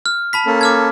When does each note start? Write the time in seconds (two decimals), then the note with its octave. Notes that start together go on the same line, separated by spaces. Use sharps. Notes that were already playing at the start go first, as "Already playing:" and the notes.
0.06 F6
0.33 A5 B5 B6
0.46 A#3 C#4 A4
0.61 D6 F6 G#6